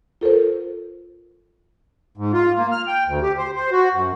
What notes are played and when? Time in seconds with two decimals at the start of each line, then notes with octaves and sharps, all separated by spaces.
0.21 F4 A4 A#4 C5
2.17 G#2
2.33 F4
2.58 A#3
2.72 F6
2.87 G5
3.07 D2
3.22 G4
3.38 C5
3.55 C5
3.72 F#4
3.94 F#2